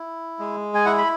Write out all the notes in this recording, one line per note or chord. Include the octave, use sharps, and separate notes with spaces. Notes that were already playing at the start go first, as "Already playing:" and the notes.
Already playing: E4
G#3
G#5
E4 F#5
B5